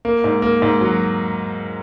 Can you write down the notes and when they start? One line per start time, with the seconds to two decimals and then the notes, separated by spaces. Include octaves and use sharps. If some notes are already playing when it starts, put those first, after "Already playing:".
0.05 A#3
0.24 G#2
0.42 A#3
0.62 G#2
0.81 F#3